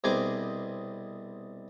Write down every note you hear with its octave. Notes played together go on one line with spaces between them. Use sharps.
C2 B2 C4 G#4 G#5 D6